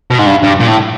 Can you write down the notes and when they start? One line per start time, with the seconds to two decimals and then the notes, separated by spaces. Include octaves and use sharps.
0.11 B2
0.19 G#2
0.26 G2
0.43 G2
0.60 A#2
0.68 A2